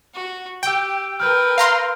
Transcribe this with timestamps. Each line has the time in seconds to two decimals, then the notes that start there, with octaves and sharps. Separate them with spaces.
0.14 F#4
0.63 G4 G5 E6 D7
1.20 A#4 B4 F6 G6
1.58 F5 A#5 C6